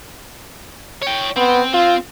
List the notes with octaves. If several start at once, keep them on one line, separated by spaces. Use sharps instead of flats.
C#5 G5
B3 C4
C4 F4